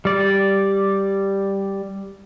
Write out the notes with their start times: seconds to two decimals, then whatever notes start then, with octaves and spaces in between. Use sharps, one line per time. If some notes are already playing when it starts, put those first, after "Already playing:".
0.05 G3 D5